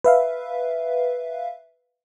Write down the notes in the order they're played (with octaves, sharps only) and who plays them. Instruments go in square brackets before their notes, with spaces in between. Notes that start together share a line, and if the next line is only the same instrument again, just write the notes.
[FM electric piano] B4 E5 F5